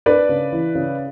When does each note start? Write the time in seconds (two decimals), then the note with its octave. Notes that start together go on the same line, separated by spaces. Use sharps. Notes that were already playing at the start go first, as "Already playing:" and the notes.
0.06 D4 B4 D5
0.29 C#3
0.52 E3
0.75 C#3